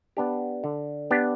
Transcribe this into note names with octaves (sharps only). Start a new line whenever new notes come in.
B3 D4 G4
D3
B3 D4 G4